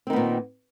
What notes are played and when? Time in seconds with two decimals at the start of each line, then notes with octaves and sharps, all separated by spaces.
0.07 C4
0.10 D#3
0.13 B3
0.16 A#2